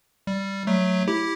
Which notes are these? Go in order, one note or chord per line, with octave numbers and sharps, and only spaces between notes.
G3
F#3 A3
E4 G4